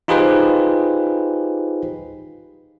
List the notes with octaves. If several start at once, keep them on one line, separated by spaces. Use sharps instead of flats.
D#4 F4 G4 G#4 B4 C5